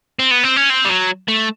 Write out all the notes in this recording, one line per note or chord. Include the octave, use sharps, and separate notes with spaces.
C4
B3
C4
C#4
C4
G3
F#3
A3